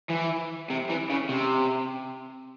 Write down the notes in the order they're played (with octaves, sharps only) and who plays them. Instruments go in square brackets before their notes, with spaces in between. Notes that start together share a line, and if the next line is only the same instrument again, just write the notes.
[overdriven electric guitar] E3
C3
E3
C#3
C3